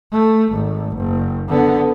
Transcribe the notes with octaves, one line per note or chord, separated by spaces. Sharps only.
A3
G#1
F#1
D3 B3